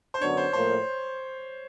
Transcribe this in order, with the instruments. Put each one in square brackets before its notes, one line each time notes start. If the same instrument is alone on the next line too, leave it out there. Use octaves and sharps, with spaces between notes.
[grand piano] C5
[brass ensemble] F#2 D3 F#3 B3 D4 [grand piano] C#5
[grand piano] C5
[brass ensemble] A2 F3 A#3 [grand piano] C5